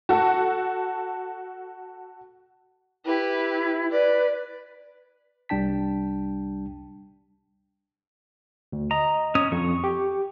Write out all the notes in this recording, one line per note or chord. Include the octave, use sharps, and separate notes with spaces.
F#4 A4
E4 G4 B4
B4 D5
C2 G3 D4 G5 A5 B6
D2
D#5 A#5
C#4 C#5 D#6
F2 C#6
G4